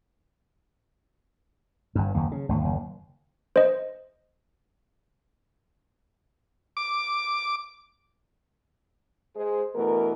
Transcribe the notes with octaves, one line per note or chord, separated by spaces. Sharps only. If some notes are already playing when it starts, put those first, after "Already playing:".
G1 G2
F#1 D#2
C#3
G#1 D2
F#1 D#2
C5 D#5
D6
G#3 G#4 C5
D2 B2 E3 A3 A#4